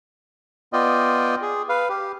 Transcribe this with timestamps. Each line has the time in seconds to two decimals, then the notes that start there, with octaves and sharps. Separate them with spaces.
0.73 B3 F4 D5 D#5 G5
1.42 G#4
1.69 B4 F5
1.89 G4